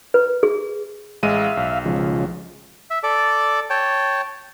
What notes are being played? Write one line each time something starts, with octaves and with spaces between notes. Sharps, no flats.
B4
G#4
A1 G#3 E5 F5 D#7
B1
C#3 F3 G#3
E5
A4 D5 D6
C#5 G5 A5